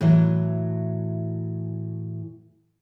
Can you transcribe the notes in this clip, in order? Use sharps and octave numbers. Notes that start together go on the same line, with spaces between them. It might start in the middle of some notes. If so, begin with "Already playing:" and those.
A2 E3 F#3